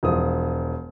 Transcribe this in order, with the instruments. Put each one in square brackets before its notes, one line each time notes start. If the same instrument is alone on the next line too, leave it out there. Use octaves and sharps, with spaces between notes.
[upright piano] E1 F3 D#6